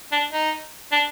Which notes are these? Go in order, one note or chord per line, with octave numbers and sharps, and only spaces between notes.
D4
D#4
D4